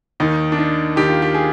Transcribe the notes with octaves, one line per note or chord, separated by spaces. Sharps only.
D#2 D#3 D#4
D4
D#4
D#2 D#3 G4
F4
G4
G#4